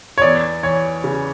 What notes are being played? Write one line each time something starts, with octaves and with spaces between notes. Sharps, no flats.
C#5
E2 D5
E3 C#5
C#3